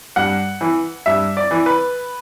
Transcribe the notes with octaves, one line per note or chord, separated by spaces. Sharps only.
G2 F#5
E3
G2 E5
D5
E3
B4